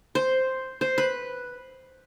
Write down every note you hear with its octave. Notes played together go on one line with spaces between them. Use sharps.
C5
C5
B4